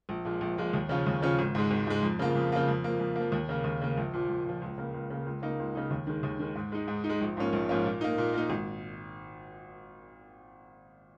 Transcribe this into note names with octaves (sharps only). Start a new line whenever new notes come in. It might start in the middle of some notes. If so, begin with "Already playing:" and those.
A#1
A#2 F3 G#3
A#1
A#2 F3 G#3
D#2
C#3 F3 C#4 F4
D#2
C#3 F3 C#4 F4
G#1
G#2 G#3
G#1
G#2 G#3
F2
C#3 F3 A#3 F4
F2
C#3 F3 A#3 F4
F2
F3 A#3
F2
F3 A#3
D#2
C#3 A#3
D#2
C#3 A#3
A#1
A#2 F3
A#1
A#2 F3
C#2
C#3 A#3
C#2
C#3 A#3
C#2
C#3 A#3 D#4
C#2
C#3 A#3 D#4
D#2
D#3 G#3
D#2
D#3 G#3
G#2
G#3 D#4
G#2
D#4
G#3
A#1
G#2 F3 A#3 C#4
A#1
G#2 F3 A#3 C#4
A#2
A#3 D#4
A#2
A#3 D#4
G#1